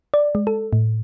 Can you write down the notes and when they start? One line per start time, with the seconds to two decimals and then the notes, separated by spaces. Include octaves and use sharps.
0.14 D5
0.35 G#3
0.47 A4
0.73 A2